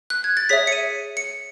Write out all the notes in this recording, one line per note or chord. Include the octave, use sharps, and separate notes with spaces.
F#6
G#6
A6
G#4 C#5 E5 B6
C#7
D#7
C#7